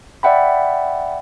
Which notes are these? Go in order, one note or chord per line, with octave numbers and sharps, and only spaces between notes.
D5 E5 F#5 G5 B5